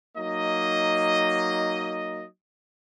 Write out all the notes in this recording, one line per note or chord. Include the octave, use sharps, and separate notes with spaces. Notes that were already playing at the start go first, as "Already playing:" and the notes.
F#3 A#3 D#4 D#5